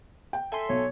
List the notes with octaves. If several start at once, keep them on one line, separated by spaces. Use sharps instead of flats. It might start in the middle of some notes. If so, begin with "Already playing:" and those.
G5
A4 E5 G#5 C6
B1 C#5